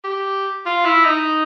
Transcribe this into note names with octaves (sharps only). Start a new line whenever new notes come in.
G4
F4
E4
D#4